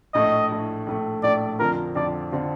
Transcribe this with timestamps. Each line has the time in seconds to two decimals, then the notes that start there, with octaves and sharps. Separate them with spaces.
0.14 A#1 A2 A3 D#5
0.50 A#1 A2 A3
0.87 A#1 A2 A3
1.23 A#1 A2 A3 D5
1.59 F2 D3 F3 C4 F4 A#4
1.95 F2 D3 F3 C4 F4 D5
2.32 D3 F3 C4 F4